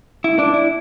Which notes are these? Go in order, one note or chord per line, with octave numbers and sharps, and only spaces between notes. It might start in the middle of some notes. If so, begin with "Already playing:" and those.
E4
D4
E4